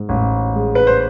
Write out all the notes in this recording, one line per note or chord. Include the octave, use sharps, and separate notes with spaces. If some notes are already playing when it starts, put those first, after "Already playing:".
Already playing: G#2
A1
G#3
B4
C5